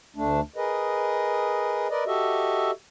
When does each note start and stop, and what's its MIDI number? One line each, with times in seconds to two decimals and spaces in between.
0.16 0.40 38
0.16 0.40 57
0.16 0.40 62
0.56 1.88 68
0.56 1.88 70
0.56 1.88 71
0.56 1.88 75
1.90 2.04 70
1.90 2.04 71
1.90 2.04 74
1.90 2.04 75
2.07 2.71 66
2.07 2.71 67
2.07 2.71 69
2.07 2.71 75
2.07 2.71 76